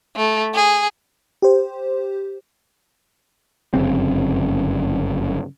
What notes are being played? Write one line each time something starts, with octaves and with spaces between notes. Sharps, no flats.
A3
G#4
G4 C5
G1 F#2 C#3 C4